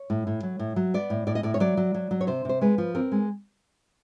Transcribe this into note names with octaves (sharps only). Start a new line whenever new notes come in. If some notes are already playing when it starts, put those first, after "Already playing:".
Already playing: C#5
A2
A2
F#3
A2
F#3
B3 D5
A2
A2 D5
D#5
A2 D5
C#5
F#3 D5
F#3
F#3
F#3
C#5
C3 C5
C3 C5
G#3 B4
F3
C4 A#4
G#3